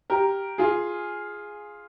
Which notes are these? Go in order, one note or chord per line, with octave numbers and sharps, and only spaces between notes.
G4 A#4
F4 G#4